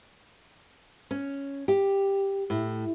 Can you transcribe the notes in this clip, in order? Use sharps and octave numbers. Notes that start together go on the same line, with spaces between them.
C#4
G4
A2